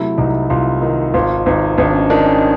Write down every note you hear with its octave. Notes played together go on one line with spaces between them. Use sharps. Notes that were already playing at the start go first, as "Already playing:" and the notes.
Already playing: C3 F#3 A3 E4
C2 D#4
C2 F4
D#3
G#1 F4
G#1 D#4
G#1 D4
C#4
D#3 D4
C#4